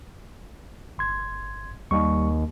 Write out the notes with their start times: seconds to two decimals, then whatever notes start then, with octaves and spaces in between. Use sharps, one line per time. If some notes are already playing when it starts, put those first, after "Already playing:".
0.98 G1 C6 G#6
1.91 D#2 G3 C#6